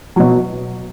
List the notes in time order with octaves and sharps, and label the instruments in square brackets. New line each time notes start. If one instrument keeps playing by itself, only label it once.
[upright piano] B2 F#3